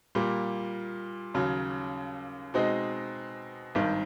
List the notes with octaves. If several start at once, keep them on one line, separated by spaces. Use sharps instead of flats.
A#2 G3 A#3
D#2 C#3 F#3
B2 G#3 C4 D#4
G#1 G2 D#3